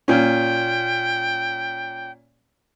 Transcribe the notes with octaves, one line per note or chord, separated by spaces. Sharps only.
A#2 C#4 G5